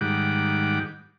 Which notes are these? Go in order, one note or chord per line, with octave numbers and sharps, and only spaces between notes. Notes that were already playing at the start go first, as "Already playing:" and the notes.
G#2 D#3 G3 F#5 D6